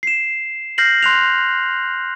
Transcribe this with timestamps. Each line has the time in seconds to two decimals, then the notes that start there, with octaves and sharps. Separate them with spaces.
0.03 C7 E7
0.78 F6 G6 A#6 C7 F#7
1.03 C6 F#6 F7